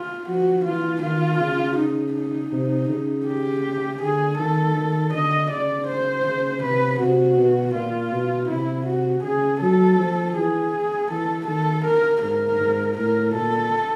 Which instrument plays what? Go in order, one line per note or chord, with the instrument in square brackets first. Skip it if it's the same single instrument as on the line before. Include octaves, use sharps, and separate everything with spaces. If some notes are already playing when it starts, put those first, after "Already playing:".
Already playing: [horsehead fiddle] F4
[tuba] F3 [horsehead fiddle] F#4
[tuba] E3 [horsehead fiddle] F4
[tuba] D#3 [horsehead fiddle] F4
[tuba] C#3
[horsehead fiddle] D#4
D#4
[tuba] C3
C#3
[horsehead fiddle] G4
[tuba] D3 [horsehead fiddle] G#4
[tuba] D#3 [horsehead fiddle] A4
[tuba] D#3
[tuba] D3 [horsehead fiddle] D#5
[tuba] C#3 [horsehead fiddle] D5
[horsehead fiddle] C5
[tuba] C#3
[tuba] C3 [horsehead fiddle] B4
[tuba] C3 [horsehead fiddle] F#4
[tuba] B2
[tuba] A#2 [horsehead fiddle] F4
[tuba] B2
[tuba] C3 [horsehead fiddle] E4
[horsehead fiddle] F#4
[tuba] C#3 [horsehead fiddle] G#4
[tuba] F#3 [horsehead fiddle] A4
[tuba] F3
[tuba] E3 [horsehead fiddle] G#4
[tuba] E3 [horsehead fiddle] A4
[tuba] D#3 [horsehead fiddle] A4
[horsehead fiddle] A#4
[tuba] G#2 [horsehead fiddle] A#4
[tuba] G#2
[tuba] A2 [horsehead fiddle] A#4
[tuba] A#2 [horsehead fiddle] A4